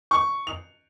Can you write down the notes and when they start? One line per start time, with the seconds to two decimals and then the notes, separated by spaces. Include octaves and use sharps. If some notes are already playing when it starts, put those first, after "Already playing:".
0.11 C#6
0.47 F7